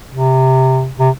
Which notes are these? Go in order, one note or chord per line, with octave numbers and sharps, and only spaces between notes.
C3
C3